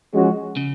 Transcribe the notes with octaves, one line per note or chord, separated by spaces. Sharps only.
F3 G#3 C#4 F#4
C#3